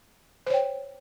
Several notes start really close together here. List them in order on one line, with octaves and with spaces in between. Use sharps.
C5 C#5 G5